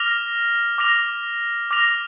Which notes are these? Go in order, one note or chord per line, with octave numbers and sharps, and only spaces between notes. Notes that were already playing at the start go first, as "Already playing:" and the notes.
Already playing: D6 F6 A#6 F7
D6 F6 A#6 F7
D6 F6 A#6 F7